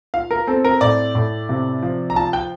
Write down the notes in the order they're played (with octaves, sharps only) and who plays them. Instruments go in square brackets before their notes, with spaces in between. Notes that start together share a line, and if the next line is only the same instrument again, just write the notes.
[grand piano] F4 F5
A#4
C4 A4
A#4
A2 D5
A2
C3
F3
A#5
F4 A5
G5